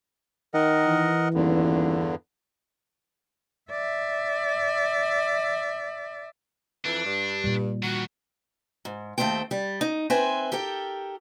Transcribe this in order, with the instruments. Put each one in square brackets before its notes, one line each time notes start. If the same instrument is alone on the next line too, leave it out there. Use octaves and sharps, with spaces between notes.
[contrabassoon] D#3 [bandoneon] A#4 D#5 F#5
[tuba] E3
[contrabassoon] D#1 [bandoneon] E2 G2 D3
[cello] D5 E5
[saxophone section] F2 E3 [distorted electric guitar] D4
[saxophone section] G2
[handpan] A#2 G3
[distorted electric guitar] D#3 E3 [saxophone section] F#4
[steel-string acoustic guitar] G#2
D#2 A3 C4 C5 G5
G3
D#4
C4 B4 C5 E5 G#5
G4 A4 A#4 G5